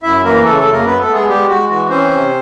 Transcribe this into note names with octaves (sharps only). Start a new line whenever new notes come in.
F#2 E4 E5
E3 A#3 A#4
C#3 A3 A4
A3 A4
F#2
A#3 A#4
B3 B4
A3 A4
B3
G#3 G#4
G3 G#3 G4
G#3 F#4
E3 F#4
C4 C#4 C5
C3